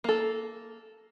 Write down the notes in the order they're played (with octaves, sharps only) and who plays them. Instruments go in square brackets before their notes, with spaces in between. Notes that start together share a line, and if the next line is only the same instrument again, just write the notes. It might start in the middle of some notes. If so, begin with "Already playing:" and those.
[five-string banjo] A#3 A4